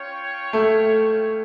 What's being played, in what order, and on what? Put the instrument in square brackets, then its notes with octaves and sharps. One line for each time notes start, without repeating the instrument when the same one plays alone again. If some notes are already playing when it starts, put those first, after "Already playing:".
Already playing: [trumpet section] C#4 F4 C#5 G5
[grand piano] A3